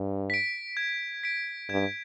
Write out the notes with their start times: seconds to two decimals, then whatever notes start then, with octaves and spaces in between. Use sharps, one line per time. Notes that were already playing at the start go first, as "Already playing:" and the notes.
Already playing: G2
0.30 B6 D7
0.77 G#6
1.23 B6 D7
1.70 G2 G#6